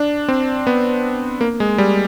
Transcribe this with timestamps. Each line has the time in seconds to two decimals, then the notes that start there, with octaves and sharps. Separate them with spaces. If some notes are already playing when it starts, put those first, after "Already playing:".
Already playing: D4
0.28 C4
0.67 B3
1.41 A#3
1.60 G#3
1.78 G3